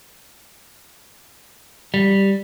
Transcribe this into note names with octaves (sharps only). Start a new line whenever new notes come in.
G3